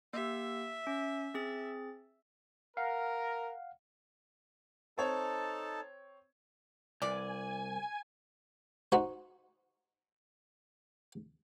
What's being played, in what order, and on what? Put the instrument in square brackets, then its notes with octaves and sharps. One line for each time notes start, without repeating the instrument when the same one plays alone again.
[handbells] A#3 G4 [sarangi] E5
[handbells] C#4
C4 G#4 A6
[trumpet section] A#4 [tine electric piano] F5 F#5
[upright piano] C4 C#5 [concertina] D#4 A4 A5
[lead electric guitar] C2 [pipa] E3 D5 [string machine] G#5
[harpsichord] D#4 F#4 C5